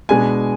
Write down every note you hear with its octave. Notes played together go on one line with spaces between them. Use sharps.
B2 G#3 D4 G#5